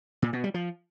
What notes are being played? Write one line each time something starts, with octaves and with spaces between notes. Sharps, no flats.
A#2
B2
G3
F3